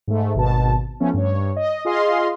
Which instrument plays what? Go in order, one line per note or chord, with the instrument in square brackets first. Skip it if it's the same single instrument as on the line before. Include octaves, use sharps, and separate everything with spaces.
[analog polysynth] G#2 A3
G#1 B2 A5
F3 A3 B3 C#4
G2 C#5
D#5
F4 G#4 D#5 F5 C6